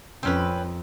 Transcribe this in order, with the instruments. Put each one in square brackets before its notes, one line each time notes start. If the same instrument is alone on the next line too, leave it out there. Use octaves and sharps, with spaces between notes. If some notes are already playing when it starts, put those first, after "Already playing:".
[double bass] F2 [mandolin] C4 C#4 B4